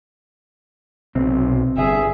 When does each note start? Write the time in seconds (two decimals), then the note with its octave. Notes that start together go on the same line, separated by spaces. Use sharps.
1.15 B1 C3 C4
1.77 G1 G#4 E5